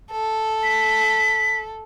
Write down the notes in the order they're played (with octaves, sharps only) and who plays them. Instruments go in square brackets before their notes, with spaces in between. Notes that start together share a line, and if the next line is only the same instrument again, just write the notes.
[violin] A4
[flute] B6